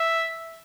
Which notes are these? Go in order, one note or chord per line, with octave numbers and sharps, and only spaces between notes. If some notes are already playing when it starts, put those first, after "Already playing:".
Already playing: E5